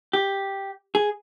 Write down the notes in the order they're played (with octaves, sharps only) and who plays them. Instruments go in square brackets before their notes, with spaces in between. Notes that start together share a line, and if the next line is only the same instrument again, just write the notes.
[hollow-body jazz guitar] G4
G#4